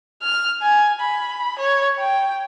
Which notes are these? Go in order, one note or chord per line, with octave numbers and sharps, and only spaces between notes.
F6
G#5
B5
C#5
G5